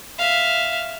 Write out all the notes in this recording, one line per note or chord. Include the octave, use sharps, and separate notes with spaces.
E5 F5